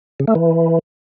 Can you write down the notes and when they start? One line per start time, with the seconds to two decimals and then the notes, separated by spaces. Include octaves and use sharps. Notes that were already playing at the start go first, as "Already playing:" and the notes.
0.20 C#3
0.27 A3
0.35 E3